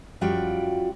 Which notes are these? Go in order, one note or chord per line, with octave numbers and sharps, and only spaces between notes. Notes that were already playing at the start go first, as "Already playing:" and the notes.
F#2 F3 G3 F4 F#4 G5